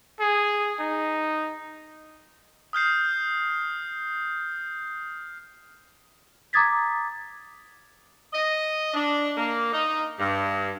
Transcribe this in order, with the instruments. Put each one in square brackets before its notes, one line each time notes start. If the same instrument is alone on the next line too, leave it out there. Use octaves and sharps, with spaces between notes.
[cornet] G#4
D#4
[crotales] D#6 F6 G6 C7
[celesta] A#5 D6 D#6 G#6 A6 B6
[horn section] D#5
D4
A#3
D#4
G2